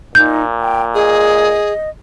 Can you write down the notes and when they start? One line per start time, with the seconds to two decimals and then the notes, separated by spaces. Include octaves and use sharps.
0.15 A#2 D#4 G6
0.61 G5
0.95 G#4 D#5